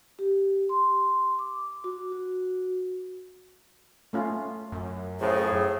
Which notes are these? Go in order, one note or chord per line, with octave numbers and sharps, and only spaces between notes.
G4
C6
D6
F#4
F#4
A3 C#4 F4
F#2
A2 C#3 F3 G#4